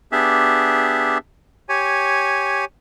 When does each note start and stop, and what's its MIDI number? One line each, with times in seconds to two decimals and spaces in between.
0.12 1.18 59
0.12 1.18 62
0.12 1.18 67
0.12 1.18 68
0.12 1.18 76
1.69 2.65 67
1.69 2.65 73
1.69 2.65 80